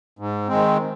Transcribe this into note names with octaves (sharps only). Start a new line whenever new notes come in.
G#2
D#3 G#3 C4